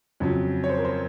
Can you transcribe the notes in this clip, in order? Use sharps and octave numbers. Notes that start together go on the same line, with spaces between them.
F2 C#3 F#3 C#4
C#5
C5
A#4
C5